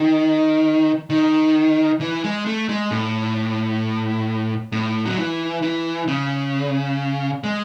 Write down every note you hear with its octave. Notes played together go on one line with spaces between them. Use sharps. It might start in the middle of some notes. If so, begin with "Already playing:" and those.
Already playing: D#3
D#3
E3
G#3
A3
G#3
A2
A2
F#3
E3
E3
C#3
G#3